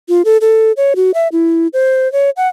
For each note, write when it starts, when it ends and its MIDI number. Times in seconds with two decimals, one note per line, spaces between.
0.09 0.22 65
0.25 0.37 69
0.41 0.72 69
0.77 0.94 73
0.96 1.11 66
1.14 1.28 76
1.32 1.68 64
1.73 2.11 72
2.12 2.30 73
2.37 2.48 78